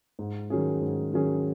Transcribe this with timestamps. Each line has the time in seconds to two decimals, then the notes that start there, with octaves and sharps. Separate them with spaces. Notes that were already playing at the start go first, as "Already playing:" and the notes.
0.19 G#2
0.50 D#3 F#3 C#4 G#4
0.82 G#2
1.13 D#3 F#3 C#4 G#4